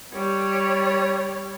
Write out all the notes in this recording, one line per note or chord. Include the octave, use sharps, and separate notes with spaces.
G3 C#5